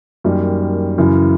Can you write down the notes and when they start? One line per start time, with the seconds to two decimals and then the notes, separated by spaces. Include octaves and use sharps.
0.24 F#2 D#3 G3 A#3
0.98 F#2 C#3 E3